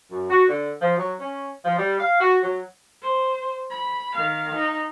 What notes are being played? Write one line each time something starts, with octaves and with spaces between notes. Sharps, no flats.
F#2
F#4
D3
F3
F#3
C#4
F3
G3
F5
F#4
F#3
C5
B5
D#3 F5
D#4